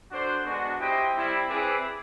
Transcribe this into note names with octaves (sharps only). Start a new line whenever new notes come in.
D4 F#4 A4 C5
G#3 B3 D4 F#4
E4 G4 C5 D#5 G5
G3 C4 E4
C4 E4 G#4 B4 D5